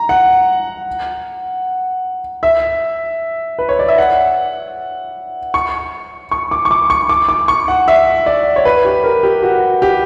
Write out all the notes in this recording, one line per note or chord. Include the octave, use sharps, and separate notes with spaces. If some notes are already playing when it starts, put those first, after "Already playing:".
Already playing: A#5
F#5
E5
B4
C#5
D5
E5
F#5
C#6
C#6
D6
C#6
D6
C#6
D6
D6
C#6
F#5
E5
D5
C#5
B4
G4
A#4
G4
F#4
G4